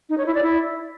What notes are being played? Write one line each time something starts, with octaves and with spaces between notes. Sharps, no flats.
D#4
C#5
E4
D5
E4